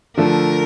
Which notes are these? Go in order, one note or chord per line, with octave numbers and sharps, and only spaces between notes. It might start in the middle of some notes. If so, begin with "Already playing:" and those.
D3 F3 A3 A#4